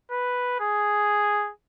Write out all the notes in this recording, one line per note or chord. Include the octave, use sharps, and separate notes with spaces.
B4
G#4